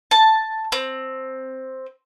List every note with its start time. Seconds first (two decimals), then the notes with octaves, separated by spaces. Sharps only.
0.11 A5
0.72 C4